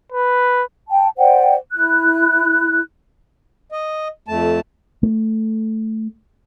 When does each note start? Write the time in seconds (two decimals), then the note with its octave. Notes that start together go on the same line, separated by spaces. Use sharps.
0.12 B4
0.89 G5 A5
1.17 C5 D5 F#5 G5
1.72 E4 F#6
3.72 D#5
4.28 F2 A3 A5
5.03 A3